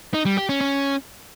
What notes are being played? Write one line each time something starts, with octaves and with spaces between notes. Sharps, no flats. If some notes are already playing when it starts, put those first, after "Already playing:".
D#4
G3
G4
C#4
C#4